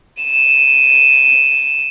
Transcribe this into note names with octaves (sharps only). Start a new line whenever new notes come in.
D#7 E7